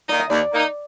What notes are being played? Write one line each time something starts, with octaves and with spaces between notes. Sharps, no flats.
D#3 A#3 D#4 D5
D#5
D#2 D5
D#3 A#3 D#4